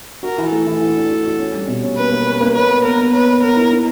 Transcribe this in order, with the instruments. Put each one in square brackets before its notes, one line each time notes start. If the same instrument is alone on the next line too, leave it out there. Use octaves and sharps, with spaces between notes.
[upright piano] F#4 [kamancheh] A#4
[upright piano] E3
[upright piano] A3 [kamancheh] A4
[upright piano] E3
E3
D4
F#4
F#4
C#4
G3
B2
C#4
[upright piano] A#3 [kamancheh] B4
[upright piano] A#3
C#4
A#3
[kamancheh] B4 [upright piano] C#5
[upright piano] B3
[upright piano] B3 [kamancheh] A#4
[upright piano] B3
[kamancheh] B4 [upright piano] C#5
[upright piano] C#5
[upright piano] B3 [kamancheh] A#4
[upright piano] E4
D#4